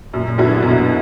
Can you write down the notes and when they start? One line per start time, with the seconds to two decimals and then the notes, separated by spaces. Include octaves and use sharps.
0.14 F#2 A#2
0.38 D3 F#3 B3 E4
0.62 F#2 B2